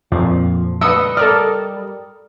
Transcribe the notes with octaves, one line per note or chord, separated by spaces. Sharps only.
F2 A#2 F3
G3 B4 D#5 D#6 E6 C#7
A4 A#4 D5 F6